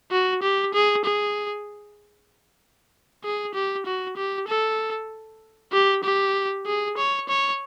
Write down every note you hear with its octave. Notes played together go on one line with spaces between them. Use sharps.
F#4
G4
G#4
G#4
G#4
G4
F#4
G4
A4
G4
G4
G#4
C#5
C#5